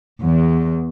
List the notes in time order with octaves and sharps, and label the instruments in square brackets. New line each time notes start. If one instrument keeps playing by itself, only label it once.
[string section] E2